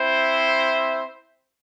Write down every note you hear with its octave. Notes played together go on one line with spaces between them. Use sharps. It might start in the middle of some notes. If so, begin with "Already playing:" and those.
Already playing: C4 E4 C5 E5